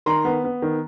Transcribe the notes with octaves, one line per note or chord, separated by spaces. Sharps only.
D#3 A#5 C6
B3
B3
D#3